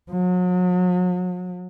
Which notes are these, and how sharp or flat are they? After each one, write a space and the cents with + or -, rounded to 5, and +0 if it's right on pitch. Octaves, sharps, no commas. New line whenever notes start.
F#3 -40